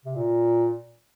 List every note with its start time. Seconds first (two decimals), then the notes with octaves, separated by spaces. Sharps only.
0.05 C3
0.16 A#2